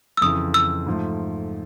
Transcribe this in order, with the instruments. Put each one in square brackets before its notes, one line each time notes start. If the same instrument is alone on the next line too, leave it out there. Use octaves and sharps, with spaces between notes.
[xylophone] E6
[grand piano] F2 C#3 E3 [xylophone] D#6
[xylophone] E6
[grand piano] G#2 F3 A3